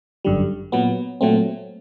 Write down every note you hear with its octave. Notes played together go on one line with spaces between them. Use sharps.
G1 F#2 D3 G3
A#2 F#3 B3
A#2 F#3 A3 C4